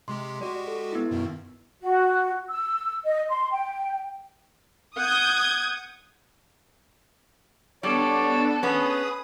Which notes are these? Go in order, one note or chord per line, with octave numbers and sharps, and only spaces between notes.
C3 G#3 G4 C6
G#3 F#4 G4 D5
A4
B3 E4
F#2 B2 D#3
F#4
E6
D#5
C6
G5
F#5 D#6 G6 G#6
G3 B3 D4 A4 C#5 D5
B3 C#4 G#4 B4 D#6